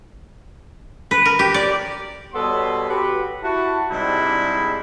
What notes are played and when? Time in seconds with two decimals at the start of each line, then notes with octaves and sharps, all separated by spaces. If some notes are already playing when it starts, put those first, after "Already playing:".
1.11 B4
1.25 A#4
1.39 G4
1.54 D5
2.34 B2 G3 B3 A4 C#5 C6
2.88 F#4 G4 B4
3.42 E4 F#4 A5
3.90 G#2 C3 G3 G#3 D4 E4